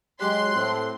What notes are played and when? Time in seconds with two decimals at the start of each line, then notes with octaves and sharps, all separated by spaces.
0.20 F#3 G#3 G4 C6 F#6
0.55 A2 C4